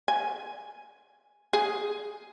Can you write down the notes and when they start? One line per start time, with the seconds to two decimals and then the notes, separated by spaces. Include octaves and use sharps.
0.08 G#5
1.53 G#4